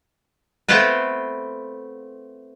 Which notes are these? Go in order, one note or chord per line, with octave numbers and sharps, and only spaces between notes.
A3 B3 C4 F4 B4